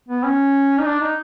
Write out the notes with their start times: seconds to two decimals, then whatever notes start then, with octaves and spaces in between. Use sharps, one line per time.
0.09 B3
0.24 C#4
0.79 D#4
0.86 D4
1.01 D#4